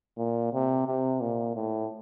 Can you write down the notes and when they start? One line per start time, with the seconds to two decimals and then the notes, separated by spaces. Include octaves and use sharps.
0.17 A#2
0.53 C3
0.87 C3
1.21 A#2
1.55 A2